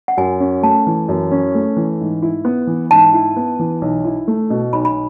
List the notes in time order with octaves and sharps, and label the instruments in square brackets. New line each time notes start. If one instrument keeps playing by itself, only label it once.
[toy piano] F#5
[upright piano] F#2 [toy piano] G#5
[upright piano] C#4
[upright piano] A3 [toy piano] A5
[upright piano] E3
F#2
C#4
A3
E3
G#2
E4
B3
E3
[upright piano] G#2 [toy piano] A5
[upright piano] E4
B3
E3
B1
E4
A3
B2
[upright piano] B1 [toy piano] B5
[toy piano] B5